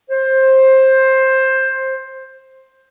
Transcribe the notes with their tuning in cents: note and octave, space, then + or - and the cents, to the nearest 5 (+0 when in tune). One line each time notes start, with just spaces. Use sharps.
C5 +15